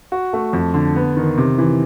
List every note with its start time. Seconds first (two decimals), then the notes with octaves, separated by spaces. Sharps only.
0.12 F#4
0.33 A3
0.53 F2
0.74 D3
0.96 B3
1.17 D#3
1.37 C3
1.58 E3